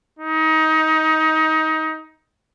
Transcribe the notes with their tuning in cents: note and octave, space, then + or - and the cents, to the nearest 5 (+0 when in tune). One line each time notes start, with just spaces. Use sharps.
D#4 +20